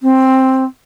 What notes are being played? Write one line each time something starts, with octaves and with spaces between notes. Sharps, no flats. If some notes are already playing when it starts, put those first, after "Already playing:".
C4